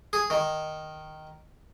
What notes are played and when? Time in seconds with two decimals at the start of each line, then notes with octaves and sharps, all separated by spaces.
0.13 G#4
0.30 D#3